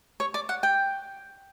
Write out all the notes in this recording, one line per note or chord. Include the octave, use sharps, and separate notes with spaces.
C#5
D5
F#5
G5